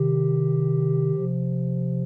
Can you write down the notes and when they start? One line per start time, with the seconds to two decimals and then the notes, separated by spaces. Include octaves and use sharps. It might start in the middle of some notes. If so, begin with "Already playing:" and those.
Already playing: C3 D#3 G4
1.15 C3 F3